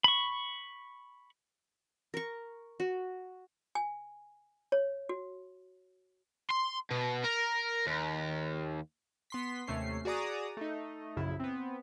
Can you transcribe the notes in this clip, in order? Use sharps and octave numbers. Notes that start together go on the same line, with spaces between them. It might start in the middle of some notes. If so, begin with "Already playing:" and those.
B5 C#6
A#4 C#6
F#4
G#5
C#5
F#4
C6
B2
A#4
D#2
B3 C6 B6
D#2 C3 A3 C#4 C7
F#4 G#4 D5 A#5 D#6
A3 D#4
A#1 F#2 C#3 E4
B3 C4